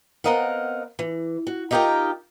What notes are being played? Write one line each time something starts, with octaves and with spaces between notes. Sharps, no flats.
B3 C4 A#4 D#5 F5 F#5
E3
F#4
D#4 F4 G4 A#4 D#5 G5